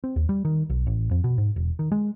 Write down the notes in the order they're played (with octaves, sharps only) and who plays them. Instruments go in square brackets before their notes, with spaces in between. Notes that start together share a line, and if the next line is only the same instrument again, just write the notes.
[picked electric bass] C4
D#2
G3
D#3
B1
A1
F2
B2
G#2
E1
D#3
G#3